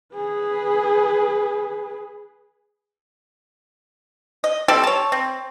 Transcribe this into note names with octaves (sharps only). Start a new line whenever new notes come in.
G#4 B4
D#5
G3 C4 G4 A4
C#5 A5
C4